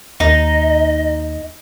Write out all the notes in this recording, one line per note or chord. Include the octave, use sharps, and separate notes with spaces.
D#2 D#4 D#5